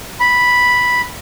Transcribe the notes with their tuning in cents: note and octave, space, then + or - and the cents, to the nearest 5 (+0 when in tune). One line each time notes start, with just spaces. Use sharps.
B5 -5